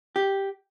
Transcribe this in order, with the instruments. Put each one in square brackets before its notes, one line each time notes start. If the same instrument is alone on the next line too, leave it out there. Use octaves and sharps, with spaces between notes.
[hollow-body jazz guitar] G4